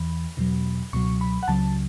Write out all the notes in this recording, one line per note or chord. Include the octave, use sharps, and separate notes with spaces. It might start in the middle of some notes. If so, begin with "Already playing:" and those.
Already playing: E2 E3 B5
E2 B2 F#3
C#2 B2 F#3 C#6
B5
F#5
C#2 C#3 F#3 A5